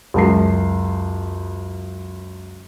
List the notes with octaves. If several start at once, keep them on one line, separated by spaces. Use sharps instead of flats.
C#2 F#2 A5 C7